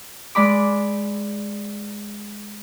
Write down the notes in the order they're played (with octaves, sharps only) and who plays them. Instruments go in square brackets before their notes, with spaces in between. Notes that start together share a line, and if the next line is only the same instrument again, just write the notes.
[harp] G#3 D5 B5 D6